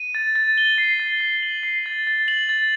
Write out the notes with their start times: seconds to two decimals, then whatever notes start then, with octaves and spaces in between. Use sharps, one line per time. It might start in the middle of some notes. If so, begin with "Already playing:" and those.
Already playing: D#7
0.15 A6
0.36 A6
0.58 G7
0.78 C7
1.00 A6
1.21 A6
1.43 F#7
1.63 C7
1.86 A6
2.07 A6
2.28 F#7
2.49 A6